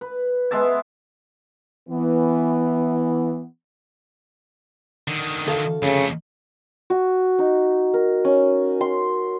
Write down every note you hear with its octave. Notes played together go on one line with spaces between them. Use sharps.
B4
G#3 B3 E5 A5
E3 B3
D3 D#3
D2 A4 F5
F2 C#3 A3
F#4
D#4
A#4
C#4
C6